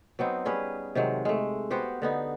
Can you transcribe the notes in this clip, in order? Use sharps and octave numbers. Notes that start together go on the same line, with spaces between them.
F#3 B3 C4 D#4
G3 C#4 G#4 B4
C3 D#3 F#3 G#3
G#3 A3
B3 F#4 G4 C5
D3 B3 D#4